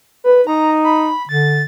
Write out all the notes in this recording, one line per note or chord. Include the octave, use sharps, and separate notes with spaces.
B4
D#4 A#5
B5
D3 A6